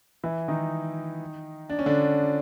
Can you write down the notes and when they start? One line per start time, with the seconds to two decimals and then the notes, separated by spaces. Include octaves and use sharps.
0.24 E3 E4
0.48 D#3 D#4
1.70 D4
1.79 C#4
1.86 D3 D4